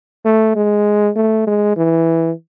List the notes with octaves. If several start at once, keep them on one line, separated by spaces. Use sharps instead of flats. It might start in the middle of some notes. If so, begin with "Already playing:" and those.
A3
G#3
A3
G#3
E3